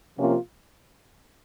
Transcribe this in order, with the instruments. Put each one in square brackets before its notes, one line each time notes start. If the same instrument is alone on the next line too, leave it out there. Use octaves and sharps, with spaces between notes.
[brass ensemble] C3 F3 A#3 C#4 F4